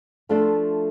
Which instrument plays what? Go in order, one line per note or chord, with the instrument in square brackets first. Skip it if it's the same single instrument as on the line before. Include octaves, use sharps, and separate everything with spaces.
[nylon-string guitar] F3 A3 D4 F4 A4